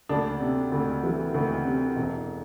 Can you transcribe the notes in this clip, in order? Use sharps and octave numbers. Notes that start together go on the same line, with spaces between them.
D2 D4
C3
D2
E3
D2
C3
E1